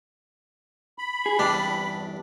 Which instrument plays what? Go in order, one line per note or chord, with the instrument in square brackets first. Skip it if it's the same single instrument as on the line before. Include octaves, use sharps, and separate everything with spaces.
[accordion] B5
[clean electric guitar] G#4
[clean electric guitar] E2 G2 G4 [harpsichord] D4